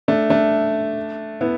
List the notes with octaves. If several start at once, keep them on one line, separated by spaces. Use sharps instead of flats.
A3 D4
A3 D4
B3 E4